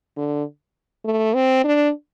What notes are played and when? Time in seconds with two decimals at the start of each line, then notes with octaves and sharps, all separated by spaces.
0.17 D3
1.05 A3
1.34 C4
1.64 D4